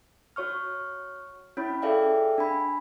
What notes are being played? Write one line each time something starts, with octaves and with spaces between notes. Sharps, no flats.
F#4 C#5 C#6 F6
C#4 E4 C#5 B5
G#4 A4 D5 E5 F5 G5
D4 G#5 B5